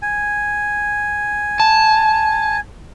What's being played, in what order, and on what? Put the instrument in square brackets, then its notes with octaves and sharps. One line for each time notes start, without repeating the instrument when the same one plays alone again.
[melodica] G#5
[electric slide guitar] A5